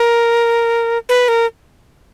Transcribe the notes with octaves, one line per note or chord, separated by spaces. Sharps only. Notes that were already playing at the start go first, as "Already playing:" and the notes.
Already playing: A#4
B4
A#4